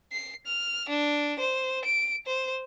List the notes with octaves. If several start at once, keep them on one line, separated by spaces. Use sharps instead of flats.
C7
F6
D4
C5
D7
C5